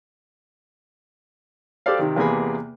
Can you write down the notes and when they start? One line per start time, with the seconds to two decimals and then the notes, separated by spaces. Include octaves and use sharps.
1.86 G4 A4 C5 D5 F5
1.99 C3 D#3
2.16 E2 C3 A#3 B3 G#4 B5